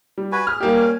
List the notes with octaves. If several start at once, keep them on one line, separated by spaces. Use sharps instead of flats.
G3
F#4 B4 G#5
G#4 F6
G3 A#3 G4
C#4 G#5